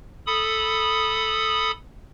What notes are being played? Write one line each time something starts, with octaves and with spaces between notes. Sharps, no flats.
A4 B5 D#6